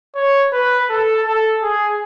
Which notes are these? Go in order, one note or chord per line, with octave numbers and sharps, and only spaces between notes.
C#5
B4
A4
A4
G#4